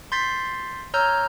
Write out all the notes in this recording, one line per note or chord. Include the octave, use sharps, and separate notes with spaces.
C6 G6 A6 B6 C7
C#5 A#5 E6 F6 G6